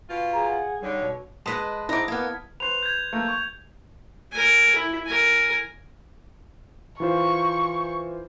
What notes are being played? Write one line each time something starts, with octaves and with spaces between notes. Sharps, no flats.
B2 F4
G#4 A#5
F#5
G2 D3 G3 D#4 C#5
B2
G#3 B4 D#5 A5 D#6 B6
G#2 E4 D#5 A#5 D6
A#3 B3 F6 G#6
B4 C5 F7
G6 G#6
A3 A#3
C#6
A#4 G#5
E4
A#4 G#5
E3 F4 C5 C#6